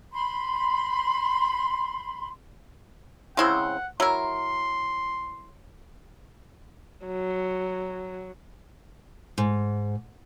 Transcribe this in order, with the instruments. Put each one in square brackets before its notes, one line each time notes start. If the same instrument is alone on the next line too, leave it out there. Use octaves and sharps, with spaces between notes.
[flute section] B5 C6
[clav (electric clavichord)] C#3 C4 [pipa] G#3 E4 C5 [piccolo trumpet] F#5
[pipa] F#3 A#4 [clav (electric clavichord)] E4 [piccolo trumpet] C6
[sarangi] F#3
[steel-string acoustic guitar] G#2